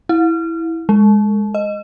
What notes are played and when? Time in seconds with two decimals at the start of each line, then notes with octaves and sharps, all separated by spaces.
0.09 E4
0.89 G#3
1.54 D#5